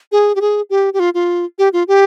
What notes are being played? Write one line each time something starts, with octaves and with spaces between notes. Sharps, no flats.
G#4
G4
G#4
G4
G4
F4
F4
G4
F4
G4